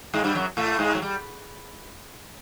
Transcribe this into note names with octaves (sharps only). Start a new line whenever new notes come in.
G#2 G#3
G2 G3
F#2 F#3
A2 A3
G#2 G#3
F#3
G3